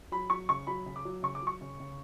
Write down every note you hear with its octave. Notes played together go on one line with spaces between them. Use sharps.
F#3 B5
F#3 C#6
C#3 C#6
F#3 B5
C#3
D6
F#3
C#3 C#6
D6
F#3 C#6
C#3
C#3